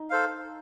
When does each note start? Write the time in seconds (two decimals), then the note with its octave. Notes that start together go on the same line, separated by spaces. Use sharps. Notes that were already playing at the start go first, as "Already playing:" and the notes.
Already playing: D#4
0.10 A4 C5 F5